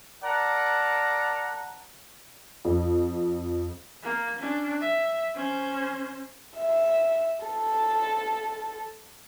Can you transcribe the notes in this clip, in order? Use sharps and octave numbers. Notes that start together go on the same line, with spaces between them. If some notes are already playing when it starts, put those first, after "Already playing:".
A#4 D5 F#5 A5 A#5
F2
A#3
C#4 D4
E5
C#4 C5
E5
A4